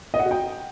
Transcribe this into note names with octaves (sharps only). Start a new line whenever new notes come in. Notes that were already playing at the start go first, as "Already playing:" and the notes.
D#5
F#5
F#4
G5